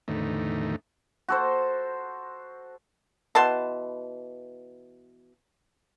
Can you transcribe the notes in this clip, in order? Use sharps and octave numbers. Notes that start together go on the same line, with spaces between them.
E2 A2 D3 D#3 A3 D#4
F#4 A4 C5
B2 E3 A5 C6